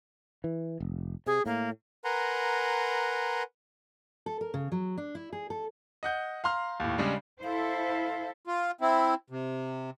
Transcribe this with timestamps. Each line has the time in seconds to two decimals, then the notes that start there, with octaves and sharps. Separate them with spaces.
0.44 E3
0.80 F1
1.26 C3 G#4
1.46 A2 A#3
2.04 A#4 B4 F#5 G#5 A#5 C6
4.26 A4
4.41 A#4
4.54 C#3
4.72 F#3
4.98 D4
5.15 E4
5.33 G#4
5.50 A4
6.03 D#5 F#5 G6
6.44 F5 A#5 C6 F6
6.80 D#2 A2
6.98 C#3 G3 G#3 D4
7.44 E4 A4 C5 F5
8.47 F4
8.81 C4 E4
9.30 C3